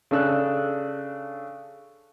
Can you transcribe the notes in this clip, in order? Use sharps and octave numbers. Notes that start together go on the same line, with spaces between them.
C#3 D4 A4 E6 F#6